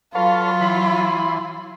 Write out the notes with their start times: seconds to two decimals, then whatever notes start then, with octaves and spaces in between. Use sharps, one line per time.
0.15 F#3 F4 A4 B4 C#5 F5
0.61 E3 B5 C6